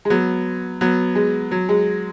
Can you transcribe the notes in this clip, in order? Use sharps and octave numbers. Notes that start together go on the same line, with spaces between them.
G#3
F#3 B3
F#3 B3
G#3
F#3
G#3